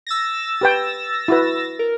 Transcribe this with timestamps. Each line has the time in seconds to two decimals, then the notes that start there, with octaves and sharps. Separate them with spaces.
0.07 E6 A6 A#6
0.61 G4 B4 G5
1.28 E4 F#4 B4
1.79 A#4